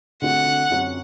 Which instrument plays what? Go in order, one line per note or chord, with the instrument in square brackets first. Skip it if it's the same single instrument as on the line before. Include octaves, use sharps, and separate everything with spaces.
[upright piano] D3 A3 C4 F#4 [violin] F#5
[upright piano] F#2 F#3 C4 F#4